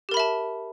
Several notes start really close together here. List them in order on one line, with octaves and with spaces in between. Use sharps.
G4 A#4 B5 E5 A5